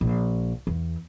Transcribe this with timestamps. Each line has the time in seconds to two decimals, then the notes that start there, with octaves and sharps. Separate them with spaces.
0.01 A#1
0.67 E2